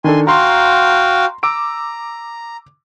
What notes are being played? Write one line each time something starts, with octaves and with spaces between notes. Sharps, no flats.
D#3 D4 A4 G#5 C6
F#4 F5 G5 A#5 C6
A#5 D6 E6 D7